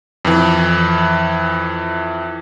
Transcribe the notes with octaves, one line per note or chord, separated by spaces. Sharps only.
F2 E3